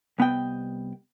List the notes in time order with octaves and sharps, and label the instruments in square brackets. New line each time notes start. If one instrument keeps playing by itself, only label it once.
[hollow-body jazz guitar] C2 B3 D#5 G5